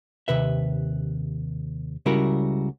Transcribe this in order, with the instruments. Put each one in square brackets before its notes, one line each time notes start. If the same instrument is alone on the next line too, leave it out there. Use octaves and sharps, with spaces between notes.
[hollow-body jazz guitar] D#2 C3 B4 E5
C#2 C#3 G3 E4 F#4 A#4